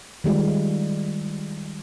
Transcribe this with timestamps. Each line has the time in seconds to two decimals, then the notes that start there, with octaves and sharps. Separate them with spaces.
0.24 D#3 G3 G#3 F4